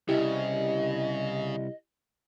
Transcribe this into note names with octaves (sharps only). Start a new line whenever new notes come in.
C2 C#3 E4 G4 D#5